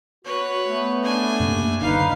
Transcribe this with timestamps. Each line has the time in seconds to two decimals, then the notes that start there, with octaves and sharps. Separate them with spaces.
0.25 F#4 B4 C#5
0.67 A3 B3
1.03 D4 G#5
1.40 F#2 C3 A#3
1.81 F#1 D2 D3 D#4 B4 F5